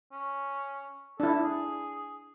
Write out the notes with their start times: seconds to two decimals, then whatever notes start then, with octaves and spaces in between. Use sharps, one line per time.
0.12 C#4
1.20 D4 E4 A4
1.43 G#4